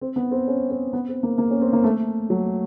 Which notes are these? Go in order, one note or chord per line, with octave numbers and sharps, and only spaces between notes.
C4
B3
C4
C#4
C4
B3
C4
A#3
A#3
C#4
C4
A#3
A3
F#3